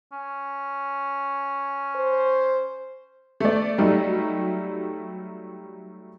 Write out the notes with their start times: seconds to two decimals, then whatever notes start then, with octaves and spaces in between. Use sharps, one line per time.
0.12 C#4
1.96 C5
3.40 A3 D5
3.78 F#3 G3 A3 D#4